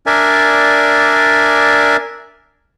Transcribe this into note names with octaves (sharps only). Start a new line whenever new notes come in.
D4 A#4 D5 E5 G#5